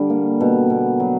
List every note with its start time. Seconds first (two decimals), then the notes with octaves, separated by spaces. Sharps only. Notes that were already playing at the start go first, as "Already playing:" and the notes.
Already playing: D3 G3
0.10 A#3
0.41 B2
0.70 B2
1.00 F#3